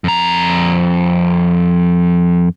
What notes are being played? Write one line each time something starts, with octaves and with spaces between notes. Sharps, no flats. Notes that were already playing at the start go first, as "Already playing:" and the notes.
F2 A#5